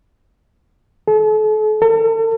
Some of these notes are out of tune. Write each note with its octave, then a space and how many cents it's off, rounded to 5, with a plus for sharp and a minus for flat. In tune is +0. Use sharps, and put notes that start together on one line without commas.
A4 -40
A4 +40